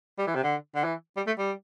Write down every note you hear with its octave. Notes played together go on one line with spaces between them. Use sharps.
G3
E3
C3
D3
D3
E3
G3
A3
G3